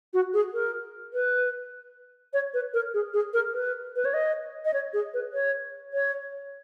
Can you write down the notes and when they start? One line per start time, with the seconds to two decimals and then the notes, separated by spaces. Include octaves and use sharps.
0.14 F#4
0.34 G#4
0.54 A#4
1.13 B4
2.33 C#5
2.54 B4
2.74 A#4
2.94 G#4
3.14 G#4
3.33 A#4
3.54 B4
3.96 B4
4.05 C#5
4.14 D#5
4.65 D#5
4.74 C#5
4.93 G#4
5.14 B4
5.33 C#5
5.94 C#5